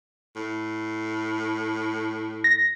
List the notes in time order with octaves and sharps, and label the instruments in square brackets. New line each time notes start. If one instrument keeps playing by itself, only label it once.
[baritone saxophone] A2
[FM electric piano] A#6